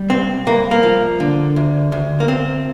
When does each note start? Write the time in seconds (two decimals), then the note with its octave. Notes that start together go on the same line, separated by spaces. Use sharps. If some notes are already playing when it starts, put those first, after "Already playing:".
Already playing: G3
0.10 C2 C4
0.47 C2 A#3
0.71 A#3
0.83 F3
1.20 D3
1.56 D2
1.92 D2
2.20 A#3
2.28 D2 C4